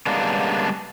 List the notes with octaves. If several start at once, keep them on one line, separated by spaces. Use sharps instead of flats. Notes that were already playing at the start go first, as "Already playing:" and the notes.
C#3 G3 G#3 A#3 B3 D4